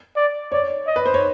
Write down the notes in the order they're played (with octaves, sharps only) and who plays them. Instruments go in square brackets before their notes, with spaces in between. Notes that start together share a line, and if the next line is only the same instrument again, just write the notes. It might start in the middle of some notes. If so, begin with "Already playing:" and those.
[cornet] D5
[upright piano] C#5 [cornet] D5
[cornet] D#5
[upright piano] B4
C5
C#5